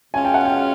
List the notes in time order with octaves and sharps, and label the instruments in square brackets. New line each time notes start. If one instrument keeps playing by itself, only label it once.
[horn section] B2 G#3 C#4 F4 G#4 [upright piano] G#5
[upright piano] G5
F#5
G5